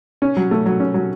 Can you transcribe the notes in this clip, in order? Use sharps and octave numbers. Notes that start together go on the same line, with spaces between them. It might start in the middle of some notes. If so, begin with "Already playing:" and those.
C#4
F#3
A3
F#3
C#4
F#3